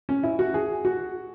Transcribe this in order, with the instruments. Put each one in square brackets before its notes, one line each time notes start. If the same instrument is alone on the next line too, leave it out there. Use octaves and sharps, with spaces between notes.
[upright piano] C#4
E4
F#4
G#4
F#4